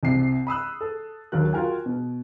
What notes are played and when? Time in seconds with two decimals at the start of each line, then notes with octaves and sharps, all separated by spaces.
0.03 C2 C3 C7
0.47 B5 D#6 E6 F#6
0.81 A4
1.32 D#2 D3 F#3 A#4 F#6
1.53 F4 F#4 A#4 G5 G#5
1.86 B2